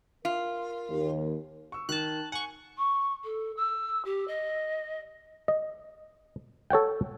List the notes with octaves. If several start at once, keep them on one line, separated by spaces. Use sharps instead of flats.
F4 A#4
D#2
C#6 E6
D#3 A5 F#6
F#5 G#5 C#6
C#6
A4
E6
G4
D#5
D#5
A4 C#5 F#5 G5